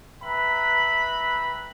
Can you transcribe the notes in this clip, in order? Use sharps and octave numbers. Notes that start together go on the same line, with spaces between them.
B4 E5 G5 A#5 B5